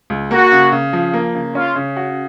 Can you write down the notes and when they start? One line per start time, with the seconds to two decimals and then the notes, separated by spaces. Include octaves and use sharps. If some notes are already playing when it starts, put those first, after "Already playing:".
0.10 C#2
0.31 A#3 F#4
0.52 C#3
0.72 C#3
0.93 F3
1.14 A#3
1.34 C#3
1.55 C#4 F4
1.76 C#3
1.97 F#4